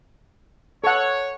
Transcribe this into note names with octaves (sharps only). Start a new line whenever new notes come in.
A4 C#5 F#5